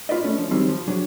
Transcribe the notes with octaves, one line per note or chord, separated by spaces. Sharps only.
F4 B4 D5 D#5
A3 C#4 D4
F3
D#3 F#3 G3 C4 D#4
F3
F#3 D4 G#4